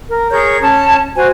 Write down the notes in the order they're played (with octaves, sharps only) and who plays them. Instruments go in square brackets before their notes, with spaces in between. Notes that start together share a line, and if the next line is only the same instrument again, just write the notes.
[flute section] A#4
G#4 A#4 C#5 G6
C#4 A5
F#4 C5 G#5